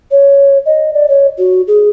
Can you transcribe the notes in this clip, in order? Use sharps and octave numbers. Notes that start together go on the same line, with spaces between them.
C#5
D#5
D5
C#5
F#4
G#4